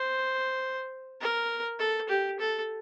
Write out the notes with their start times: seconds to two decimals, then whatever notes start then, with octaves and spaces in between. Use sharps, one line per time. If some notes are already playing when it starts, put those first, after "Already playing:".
Already playing: C5
1.21 A#4
1.79 A4
2.09 G4
2.40 A4